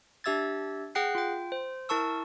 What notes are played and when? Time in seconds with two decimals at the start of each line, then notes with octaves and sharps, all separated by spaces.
0.24 D4 G4 E5 E6 G#6 A6
0.95 G#4 F#5 G5 F#6 C7
1.15 F4 G5
1.52 C5
1.89 E4 A#4 A5 C#6 E6